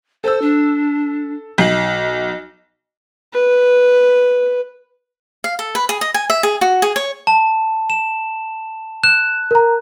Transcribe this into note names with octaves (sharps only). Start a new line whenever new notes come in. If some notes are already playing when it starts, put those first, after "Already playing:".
A4 C5 E6
D4
B1 D#5 C7 F#7
B4
F5
A4
B4
G#4
D#5
G#5
E5
G#4
F#4
G#4
C#5
A5
E7
F#6 E7
A#4 A#5